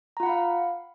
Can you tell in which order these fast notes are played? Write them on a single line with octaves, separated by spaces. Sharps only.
A#5 F4 F#5 B5 F5